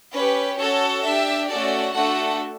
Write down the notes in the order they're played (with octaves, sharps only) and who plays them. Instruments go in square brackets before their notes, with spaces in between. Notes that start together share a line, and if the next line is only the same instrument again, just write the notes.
[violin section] C#4 G4 B4
C#4 F#4 A4 C#5
D4 G4 E5
A3 C#4 F#4 A4 D5
A3 D4 F#4 A4 F#5